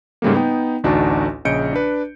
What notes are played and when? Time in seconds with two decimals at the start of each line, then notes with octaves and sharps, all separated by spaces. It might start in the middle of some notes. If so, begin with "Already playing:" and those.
0.22 G#2 C#3 G3 A3 A#3
0.34 B3 D#4 G5
0.84 A1 D2 D4 D#4 F#4 A5
1.45 A#1 C#3 D#5 G6 C#7 D7
1.73 D4 B4